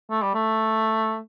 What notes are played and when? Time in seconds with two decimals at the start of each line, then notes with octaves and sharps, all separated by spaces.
0.11 A3
0.22 G3
0.34 A3